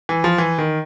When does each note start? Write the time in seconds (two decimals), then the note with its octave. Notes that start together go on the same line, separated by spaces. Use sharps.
0.09 E3
0.24 F3
0.38 E3
0.58 D#3